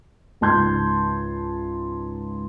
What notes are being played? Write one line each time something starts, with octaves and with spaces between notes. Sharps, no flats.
C#2 G#2 A5 C6 G6 G#6